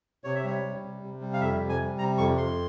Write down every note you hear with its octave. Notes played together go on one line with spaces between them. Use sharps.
C3 C#5
E5
G3 C#5
G3
C3
C3
G3
F5
F2 E5
C3
G#5
G3
C3 A#5
F2 C#6
F2 C6